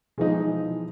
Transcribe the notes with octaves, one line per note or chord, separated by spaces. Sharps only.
B2 E3 F3 G#3 D#4